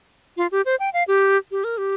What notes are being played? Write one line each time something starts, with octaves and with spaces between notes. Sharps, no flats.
F4
G4
C5
G5
F5
G4
G4
A#4
G4